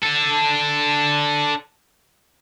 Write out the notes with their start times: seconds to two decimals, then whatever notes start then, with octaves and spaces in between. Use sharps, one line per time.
0.03 D4 A4